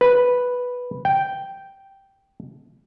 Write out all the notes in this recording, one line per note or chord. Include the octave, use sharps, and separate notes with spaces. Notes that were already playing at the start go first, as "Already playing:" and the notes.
B4
G5